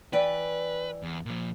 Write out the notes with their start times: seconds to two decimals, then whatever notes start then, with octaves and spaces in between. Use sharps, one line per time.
0.13 E3 B4 D5 G5
1.03 E2
1.26 A#2 F3